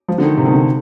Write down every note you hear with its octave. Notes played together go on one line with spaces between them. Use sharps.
F3
D3
D#3
C3
D#3
D3